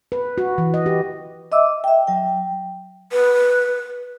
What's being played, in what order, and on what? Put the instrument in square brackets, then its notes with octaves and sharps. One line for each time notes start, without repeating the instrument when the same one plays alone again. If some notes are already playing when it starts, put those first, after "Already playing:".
[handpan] B4
F#4
E3
D#5
G4
[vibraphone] D#5 E5 D6 E6
E5 G5
F#3 G5
[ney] B4